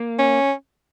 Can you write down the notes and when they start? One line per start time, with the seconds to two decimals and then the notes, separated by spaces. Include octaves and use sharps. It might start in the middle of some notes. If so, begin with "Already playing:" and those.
Already playing: A#3
0.19 C#4